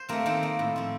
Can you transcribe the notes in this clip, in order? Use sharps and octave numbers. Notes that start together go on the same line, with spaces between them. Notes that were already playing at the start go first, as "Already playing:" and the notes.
Already playing: C5
A3 A#3 C4 A#4
D#3 C4 C5
A#3
A2
F3 C4